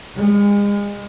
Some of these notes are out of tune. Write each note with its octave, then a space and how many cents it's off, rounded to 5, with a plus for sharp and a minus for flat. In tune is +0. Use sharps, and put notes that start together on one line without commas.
G#3 -35